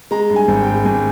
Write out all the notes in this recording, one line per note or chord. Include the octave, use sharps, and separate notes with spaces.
G#3 A#5
G2
G#5
G#1
G5
G#3
G#1 G#5